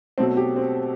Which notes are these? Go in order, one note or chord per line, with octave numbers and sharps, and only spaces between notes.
B2 F#3 A3 C4
G4
C4